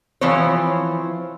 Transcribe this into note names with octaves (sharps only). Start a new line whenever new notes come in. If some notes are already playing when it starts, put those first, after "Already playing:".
E3 F3 C4 C5 C#5